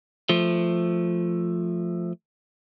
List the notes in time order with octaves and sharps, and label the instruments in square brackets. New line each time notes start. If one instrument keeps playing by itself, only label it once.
[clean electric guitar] F3 A3